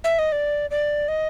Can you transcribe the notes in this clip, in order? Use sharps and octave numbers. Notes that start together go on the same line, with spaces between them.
E5
D#5
D5
D5
D#5